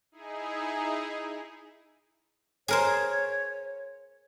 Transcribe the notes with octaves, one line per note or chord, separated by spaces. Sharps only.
D#4 E4 G#4
G#4 A#4 C5 C#5